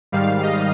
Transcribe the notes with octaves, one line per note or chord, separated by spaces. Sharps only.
G#2 D#3 G3 F5
D#5